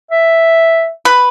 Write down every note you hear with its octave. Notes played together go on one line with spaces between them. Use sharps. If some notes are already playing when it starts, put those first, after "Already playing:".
E5
B4